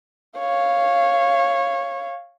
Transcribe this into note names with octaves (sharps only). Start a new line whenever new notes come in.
C#5 F5